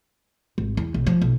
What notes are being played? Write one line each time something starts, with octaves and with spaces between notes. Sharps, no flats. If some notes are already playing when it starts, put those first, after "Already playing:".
G#1
E2
B1
F3
B1